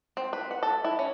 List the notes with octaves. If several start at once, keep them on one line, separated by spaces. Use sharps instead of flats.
C4
B4
F#5
A4
E4
C#4